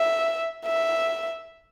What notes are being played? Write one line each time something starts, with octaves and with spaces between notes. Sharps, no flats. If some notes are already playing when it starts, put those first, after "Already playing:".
Already playing: E5
E5